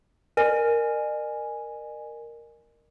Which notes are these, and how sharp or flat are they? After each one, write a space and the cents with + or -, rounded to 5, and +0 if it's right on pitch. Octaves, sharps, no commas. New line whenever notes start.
A#4 +0 D#5 -45 G#5 +0